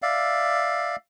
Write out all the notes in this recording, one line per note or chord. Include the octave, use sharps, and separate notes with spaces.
D5 E5 F5